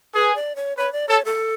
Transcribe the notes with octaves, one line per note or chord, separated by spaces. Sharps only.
G#4 B4
D5
C#5
B4 C#5
D5
A4 C#5
A4